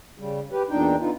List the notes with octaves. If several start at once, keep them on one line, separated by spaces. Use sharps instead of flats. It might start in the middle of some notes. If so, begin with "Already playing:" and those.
C#3 G3
G4 B4
E2 A#2 D4 D#4 G5
D3 B3 D#4 F4